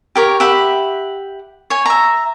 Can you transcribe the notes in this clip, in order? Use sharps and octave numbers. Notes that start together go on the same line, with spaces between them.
G4 A#4 C#5
G4 E5 F#5 B5
C#5 G#5
E5 A#5